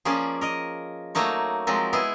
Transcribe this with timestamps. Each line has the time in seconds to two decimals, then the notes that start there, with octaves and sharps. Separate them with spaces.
0.05 F3 A#3 C#4 G#4 D5
0.41 A#4 D#5
1.15 F#3 A3 A#3 D#4 C#5
1.67 F3 F#3 G#3 C4 A#4
1.93 B3 E4 G#4